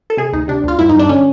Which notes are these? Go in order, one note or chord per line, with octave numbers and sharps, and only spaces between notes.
A4
C3 G#4
D2 D#4
C3 D4
D2 F4
G2 E4
G2 D#4
D4
D3 C#4